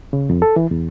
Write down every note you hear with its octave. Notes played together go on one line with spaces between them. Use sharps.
C#3
F2
A4
E3
E2